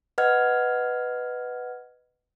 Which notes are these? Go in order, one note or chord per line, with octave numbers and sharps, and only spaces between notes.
B4 D#5 F#5 F6 G#6